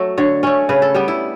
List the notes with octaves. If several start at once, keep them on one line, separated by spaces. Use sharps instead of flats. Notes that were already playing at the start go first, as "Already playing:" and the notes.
Already playing: F#3 A3
D3 C#5
A3 C#4 C#5
C#3 B4
A4
G3 B3 G4
E4